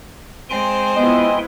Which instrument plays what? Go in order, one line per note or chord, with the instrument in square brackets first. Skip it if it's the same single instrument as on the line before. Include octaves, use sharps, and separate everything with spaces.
[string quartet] G#3 C4 C5 [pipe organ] G5 G#5 C6
[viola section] B3 E4 F4 [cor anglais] D#5